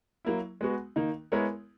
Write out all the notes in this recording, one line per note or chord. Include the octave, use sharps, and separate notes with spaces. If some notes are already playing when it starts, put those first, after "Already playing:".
F#3 A#3 E4
G#3 B3 F#4
D#3 A#3 D#4
G#3 B3 E4 A#4 C#5